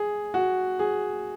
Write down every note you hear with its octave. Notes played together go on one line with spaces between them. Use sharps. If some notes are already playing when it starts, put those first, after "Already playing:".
Already playing: G#4
F#4
G#4